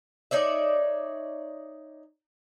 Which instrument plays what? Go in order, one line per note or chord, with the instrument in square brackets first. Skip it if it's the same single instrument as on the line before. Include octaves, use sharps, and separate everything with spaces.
[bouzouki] D#4 C#5 D5 E5